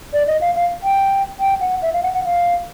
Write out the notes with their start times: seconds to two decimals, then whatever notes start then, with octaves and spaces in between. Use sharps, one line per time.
0.13 D5
0.27 D#5
0.41 F5
0.55 F5
0.83 G5
1.40 G5
1.61 F#5
1.82 E5
1.93 F5
2.03 F#5
2.14 F#5
2.25 F5